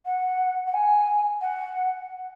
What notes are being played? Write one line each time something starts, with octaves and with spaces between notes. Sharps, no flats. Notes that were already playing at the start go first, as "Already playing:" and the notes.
F#5
F#5
G#5
F#5